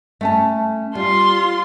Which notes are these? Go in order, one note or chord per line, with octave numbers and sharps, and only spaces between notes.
A3 C#4 A5
G3 F4 C6